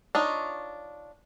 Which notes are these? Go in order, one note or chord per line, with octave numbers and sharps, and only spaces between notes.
D4 D#4 F4 C#5